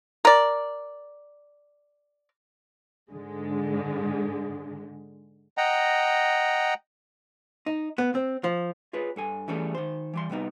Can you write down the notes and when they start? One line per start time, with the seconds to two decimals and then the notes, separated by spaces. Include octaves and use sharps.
0.25 A#4 D5
3.12 G#2 D3 G#3
5.58 D#5 F#5 G5 A#5
7.66 D#4
7.98 B3
8.15 C4
8.44 F3
8.93 F4 G#4 B4 C#5
9.16 G2 A4 G#5
9.48 E3 G3 A3 C#4 G#4 A4
9.75 D#3 C5
10.14 E3 G3 C6
10.30 C3 G3 B3 D#4